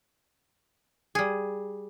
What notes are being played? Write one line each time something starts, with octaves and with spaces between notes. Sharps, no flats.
G3 G#4